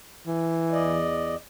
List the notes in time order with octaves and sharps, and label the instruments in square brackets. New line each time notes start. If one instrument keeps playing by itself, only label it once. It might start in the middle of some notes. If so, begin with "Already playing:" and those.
[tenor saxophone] E3
[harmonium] E2 D5 D#5